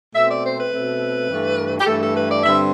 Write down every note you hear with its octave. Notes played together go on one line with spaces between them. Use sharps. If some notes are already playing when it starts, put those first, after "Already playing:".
B2 A3 C4 E5
D5
C5
B4
B2 A3 C4
G2 E3 A3
G4
G2 E3 A3 A4
A4
B4
D5
G2 D3 G3 C4 E5